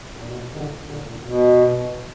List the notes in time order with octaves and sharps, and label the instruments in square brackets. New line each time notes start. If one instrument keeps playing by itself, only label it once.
[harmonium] A#2
B2
D#3
A#2 D3
A#2 D3
A#2
B2